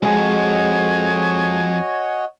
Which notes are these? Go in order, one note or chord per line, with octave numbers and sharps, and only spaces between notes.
C2 F2 G#3 F#4 G#4 C#5 D#5 G#5